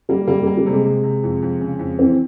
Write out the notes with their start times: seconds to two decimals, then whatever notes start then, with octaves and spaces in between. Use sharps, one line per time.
0.09 G3 A#3
0.27 G3 A#3
0.42 G3 A#3
0.57 G3
0.66 C3 G#3
0.84 C3
1.03 C3
1.23 F2
1.42 F2
1.60 C#3
1.79 F2
1.98 E3 C4